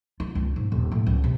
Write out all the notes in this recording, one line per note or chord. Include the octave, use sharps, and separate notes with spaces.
F4
C#2
G#2
D#1
A2
C#2
C3